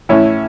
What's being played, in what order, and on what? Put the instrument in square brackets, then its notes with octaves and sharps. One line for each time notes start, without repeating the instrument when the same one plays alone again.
[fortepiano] A2 E3 C#4 E4